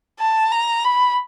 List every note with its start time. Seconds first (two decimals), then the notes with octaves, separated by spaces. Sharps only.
0.19 A5
0.51 A#5
0.84 B5